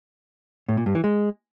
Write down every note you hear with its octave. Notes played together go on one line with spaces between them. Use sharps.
A2
A#2
G2
E3
G#3